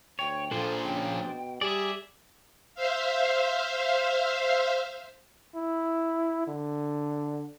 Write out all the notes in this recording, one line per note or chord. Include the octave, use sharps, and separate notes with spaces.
D2 C#5 G5
A#2 F3 D4 G#4 A4 C5
C#3 G5
B2
G3 G4 G#4 D5 E5
C5 E5 F5
E4
D3